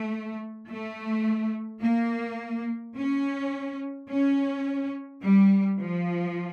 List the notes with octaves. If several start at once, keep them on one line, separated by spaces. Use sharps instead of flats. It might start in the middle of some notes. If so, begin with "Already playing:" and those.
Already playing: A3
A3
A#3
C#4
C#4
G3
F3